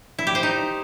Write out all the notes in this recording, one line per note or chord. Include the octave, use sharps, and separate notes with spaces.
E4
G4
C5
D#4